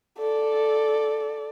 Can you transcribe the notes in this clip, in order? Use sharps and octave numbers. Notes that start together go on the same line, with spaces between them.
A4 D5